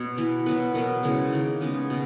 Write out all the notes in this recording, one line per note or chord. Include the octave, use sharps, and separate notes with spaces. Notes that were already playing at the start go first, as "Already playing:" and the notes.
Already playing: B2 C#5
E3 B3
B2 F#3 B3 B4
B2 F#3 B3 A#4
C#3 E3 G#3
D#3 A#3
C#3 G#3 B3
B2